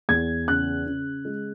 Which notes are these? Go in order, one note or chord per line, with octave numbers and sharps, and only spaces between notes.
E2 G#6
C#3 F#6
C#3
G#3